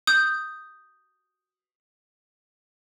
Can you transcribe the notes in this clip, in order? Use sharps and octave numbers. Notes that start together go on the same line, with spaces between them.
D#6 G6